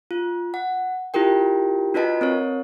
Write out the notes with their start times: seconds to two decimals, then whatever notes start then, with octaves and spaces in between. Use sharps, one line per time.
0.11 F4
0.54 F#5
1.14 E4 F4 G4 A#4 G5
1.94 D4 F4 F#4 B4 D#5 A5
2.21 C4 A#4 C#5